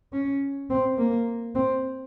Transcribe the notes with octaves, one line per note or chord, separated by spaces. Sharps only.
C#4
C4
A#3
C4